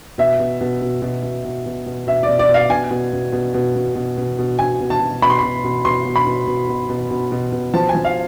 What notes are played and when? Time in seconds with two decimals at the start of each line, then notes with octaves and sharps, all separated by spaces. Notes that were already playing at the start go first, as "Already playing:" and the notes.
0.18 B2 E5
0.39 B2
0.61 B2
0.82 B2
1.02 B2
1.23 B2
1.45 B2
1.66 B2
1.86 B2
2.07 B2 E5
2.23 D5
2.28 B2
2.39 D5
2.49 B2
2.54 F5
2.70 B2 G#5
2.91 B2
3.13 B2
3.33 B2
3.54 B2
3.76 B2
3.95 B2
4.17 B2
4.39 B2
4.59 B2 G#5
4.80 B2
4.90 A5
5.00 B2
5.22 B2 B5
5.30 C6
5.39 B2 B5
5.64 B2
5.85 B2 C6
6.05 B2
6.16 B5
6.27 B2
6.47 B2
6.69 B2
6.89 B2
7.11 B2
7.32 B2
7.52 B2
7.74 F3 A5
7.89 G#5
7.95 F3
8.05 F5